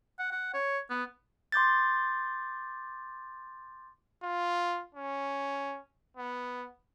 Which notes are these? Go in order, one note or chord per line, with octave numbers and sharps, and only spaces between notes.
F#5
F#5
C#5
B3
C6 D6 G6 A6
F4
C#4
B3